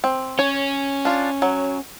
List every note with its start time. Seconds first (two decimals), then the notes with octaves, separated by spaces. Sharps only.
0.04 C4
0.39 C#4 C#5
1.05 D4 F4
1.42 F#3